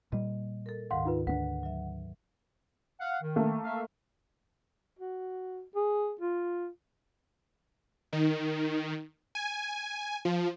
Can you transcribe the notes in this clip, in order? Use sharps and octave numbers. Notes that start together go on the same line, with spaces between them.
A#2 G3 D#5
A4 A#4
D2 G#2 D#3 F5 F#5 C6
D#4 F4 B4
D2 C4 D4 B4 F#5
F#3 E5
F5 F#5
D#3
A3 A#3
E5 F5
F#4
G#4
F4
D#3
G#5
F3